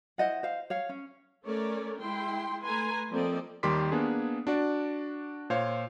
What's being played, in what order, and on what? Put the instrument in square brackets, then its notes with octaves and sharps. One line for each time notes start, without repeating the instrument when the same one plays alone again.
[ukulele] E4 C5 D#5 F#5
C5 F5
C#5 F5
C#4
[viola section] A3 C#4 A4 A#4 C#5 D5
G#3 E4 G5 C6
A3 A4 B4 G#5 A#5 C6
F3 A#3 C4 A4 D5 D#5
[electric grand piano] D#2 D#3 G3 C6 D6 B6
A#3 B3 D4 G#4
D4 F#4 D5
A#2 C5 C#5 F5